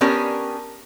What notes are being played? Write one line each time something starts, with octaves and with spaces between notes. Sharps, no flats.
B3 C#4 D4 G4 A#4